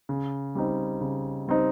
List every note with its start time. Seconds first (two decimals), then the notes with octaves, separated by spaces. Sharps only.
0.09 C#3
0.55 G3 C4 D#4
1.01 C#3
1.48 G3 C4 D#4